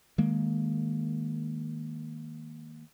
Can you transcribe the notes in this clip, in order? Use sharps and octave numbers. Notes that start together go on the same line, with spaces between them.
D#3 G#3 A#3